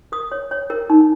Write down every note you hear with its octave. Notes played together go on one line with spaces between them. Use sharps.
A#4 D#6
C#5
C#5
A#4
D#4